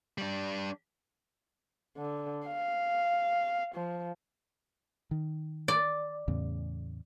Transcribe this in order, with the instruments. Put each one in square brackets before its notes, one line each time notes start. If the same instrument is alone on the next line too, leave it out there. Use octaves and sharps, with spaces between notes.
[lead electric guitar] G3 D4
[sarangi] D3
F5
F3
[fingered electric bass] D#3
[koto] D5
[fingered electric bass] E2 A2 C#3